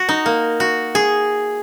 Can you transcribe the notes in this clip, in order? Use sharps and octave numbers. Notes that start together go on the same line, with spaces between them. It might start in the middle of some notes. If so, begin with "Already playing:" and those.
Already playing: F#4
D#4
A#3
F#4
G#4